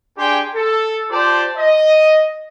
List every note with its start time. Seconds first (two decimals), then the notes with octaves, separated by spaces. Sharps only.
0.17 D4 G4 G#4 G5 G#5 C6
0.55 A4
1.11 F4 G4 C5 D5 A5
1.57 D#5